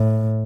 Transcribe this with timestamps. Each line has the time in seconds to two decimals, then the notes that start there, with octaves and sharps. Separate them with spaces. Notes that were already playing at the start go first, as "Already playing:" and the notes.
Already playing: A2